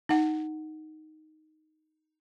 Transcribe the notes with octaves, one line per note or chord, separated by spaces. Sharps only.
D#4 F#5